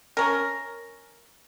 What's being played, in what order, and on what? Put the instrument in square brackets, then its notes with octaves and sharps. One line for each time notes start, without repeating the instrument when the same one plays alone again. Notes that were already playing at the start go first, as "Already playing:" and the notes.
[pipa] C#4 A#4